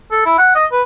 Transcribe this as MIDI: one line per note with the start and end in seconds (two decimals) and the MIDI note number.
0.11 0.24 69
0.26 0.38 64
0.38 0.51 78
0.55 0.66 75
0.72 0.82 71